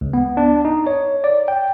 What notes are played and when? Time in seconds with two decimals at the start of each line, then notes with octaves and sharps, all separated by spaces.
0.01 C#2
0.13 B3
0.37 D4
0.65 D#4
0.87 C#5
1.24 D5
1.48 G5